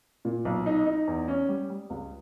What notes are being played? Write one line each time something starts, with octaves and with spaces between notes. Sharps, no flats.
A#2
B1
D#4
D#4
E2
C#4
G3
G3
C#2